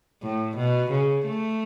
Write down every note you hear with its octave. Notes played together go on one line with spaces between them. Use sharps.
A2
B2
C#3
A3